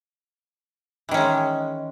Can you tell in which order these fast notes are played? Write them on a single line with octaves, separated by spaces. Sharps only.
E3 D#3 C#4 G#3